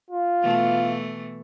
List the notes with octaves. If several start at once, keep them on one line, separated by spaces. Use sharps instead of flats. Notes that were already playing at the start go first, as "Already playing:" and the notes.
F4
B2 E3 A3